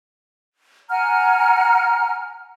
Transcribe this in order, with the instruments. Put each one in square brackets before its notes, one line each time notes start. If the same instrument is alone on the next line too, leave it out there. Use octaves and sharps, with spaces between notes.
[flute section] F#5 G#5 A#5 F6